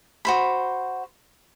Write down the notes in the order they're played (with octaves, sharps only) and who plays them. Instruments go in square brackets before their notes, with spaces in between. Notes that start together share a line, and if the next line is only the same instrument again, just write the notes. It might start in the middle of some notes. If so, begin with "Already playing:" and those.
[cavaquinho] F#4 C5 B5